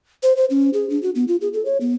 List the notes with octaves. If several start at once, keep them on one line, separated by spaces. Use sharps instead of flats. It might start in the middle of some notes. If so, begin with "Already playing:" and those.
C5
C5
C#4
G#4
D4
F#4
B3
F4
G#4
A4
C#5
B3